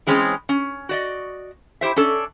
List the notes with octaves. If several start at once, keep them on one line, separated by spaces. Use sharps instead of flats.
E3 G#3 C4 C#4 G#4 C#5
C#4
F#4 D5 D#5
E4 G4 C5 E5
C#4 D4 A4